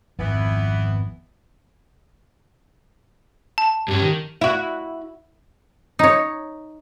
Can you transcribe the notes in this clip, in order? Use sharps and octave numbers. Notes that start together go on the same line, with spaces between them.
G#1 F2 E3 B3
A5
G2 C#4 G4
D#3
E4 F#4
D#4 C#5